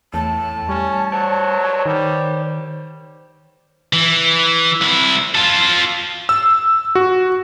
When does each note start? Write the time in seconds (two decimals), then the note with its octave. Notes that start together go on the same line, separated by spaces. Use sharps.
0.14 E2 A2 A5
0.69 G3 C#4
1.13 F#3 C5 C#5
1.86 D#3 G3
3.93 E3
4.82 C2 E4
5.35 F4 A4
6.29 E6
6.95 F#4